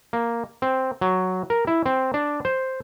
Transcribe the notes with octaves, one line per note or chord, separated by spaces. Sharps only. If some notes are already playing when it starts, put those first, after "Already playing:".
A#3
C4
F#3
A#4
E4
C4
D4
C5